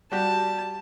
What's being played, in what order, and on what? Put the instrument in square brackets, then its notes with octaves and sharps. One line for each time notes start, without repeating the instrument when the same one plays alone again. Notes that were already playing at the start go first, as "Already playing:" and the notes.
[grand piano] G3 F#4 G4 [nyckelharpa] A5